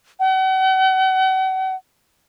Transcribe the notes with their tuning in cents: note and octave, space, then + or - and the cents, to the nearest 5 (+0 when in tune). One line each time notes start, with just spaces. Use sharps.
F#5 +40